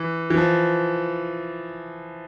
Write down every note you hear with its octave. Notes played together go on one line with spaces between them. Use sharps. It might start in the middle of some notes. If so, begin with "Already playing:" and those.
Already playing: E3
E3
F3